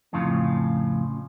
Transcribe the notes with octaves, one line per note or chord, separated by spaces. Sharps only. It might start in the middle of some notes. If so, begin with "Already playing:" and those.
F2 A2 C#3 F4